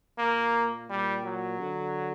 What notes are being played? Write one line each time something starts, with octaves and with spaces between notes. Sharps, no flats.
A#2 A#3
A#2 G3
F#3
D3